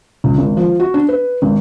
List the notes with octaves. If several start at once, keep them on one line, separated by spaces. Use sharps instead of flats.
C#2
G#1
F3
F#4
D4
B4
G#1